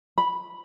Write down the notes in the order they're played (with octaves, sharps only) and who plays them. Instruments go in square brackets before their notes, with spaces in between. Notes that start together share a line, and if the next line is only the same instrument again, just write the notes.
[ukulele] B5